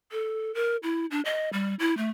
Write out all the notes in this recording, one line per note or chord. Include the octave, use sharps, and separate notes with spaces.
A4
A#4
E4
D4
D#5
G3
E4
A3